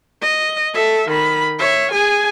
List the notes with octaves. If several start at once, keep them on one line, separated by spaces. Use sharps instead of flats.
D#5
A4 E5
D#3 B5
C#5 E5
G#4 G#5